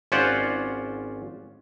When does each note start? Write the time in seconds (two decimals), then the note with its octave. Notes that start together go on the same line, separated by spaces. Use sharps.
0.12 G#1 C#4 F4 C5 D5 F#5